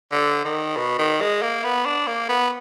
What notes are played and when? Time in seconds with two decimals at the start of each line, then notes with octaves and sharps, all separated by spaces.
0.12 D3
0.45 D#3
0.77 B2
0.99 D#3
1.21 G#3
1.42 A#3
1.64 B3
1.85 D4
2.07 A#3
2.29 B3